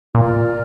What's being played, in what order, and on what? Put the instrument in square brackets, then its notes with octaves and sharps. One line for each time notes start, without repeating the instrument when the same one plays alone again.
[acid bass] A#2 [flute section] F4 A#4 D5